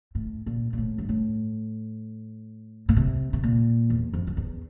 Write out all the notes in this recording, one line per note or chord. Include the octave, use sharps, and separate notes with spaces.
A2
A#2
A#2
A2
G2
A2
A#2
C3
C3
A#2
E2
F2
F2
E2